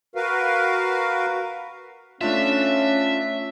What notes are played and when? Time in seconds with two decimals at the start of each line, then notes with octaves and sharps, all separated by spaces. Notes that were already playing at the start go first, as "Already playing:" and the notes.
0.15 F#4 A#4 B4 F5
2.21 A3 C#4 D4 F4 E5